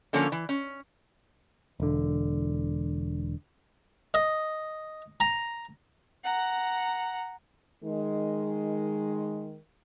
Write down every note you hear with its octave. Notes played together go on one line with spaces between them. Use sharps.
D3 F3 A#3 C#4 A4 C#5
E3
C#4
E1 D3
D#5
A#5
F#5 A#5
D#3 G#3